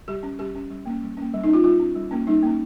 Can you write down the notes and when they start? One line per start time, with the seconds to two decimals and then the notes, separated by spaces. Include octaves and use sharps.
0.08 G3 G4
0.23 C#4
0.39 G3 G4
0.55 C#4
0.70 G3
0.86 A#3 C#4
1.02 G3
1.17 A#3 C#4
1.34 G3
1.44 D#4
1.49 C#4 F4
1.64 G3 F4
1.80 C#4
1.95 G3
2.11 A#3 C#4
2.27 G3 D#4
2.43 A#3 C#4